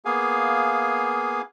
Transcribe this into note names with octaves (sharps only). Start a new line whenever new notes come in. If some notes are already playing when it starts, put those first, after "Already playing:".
A#3 B3 G#4 F5 G#5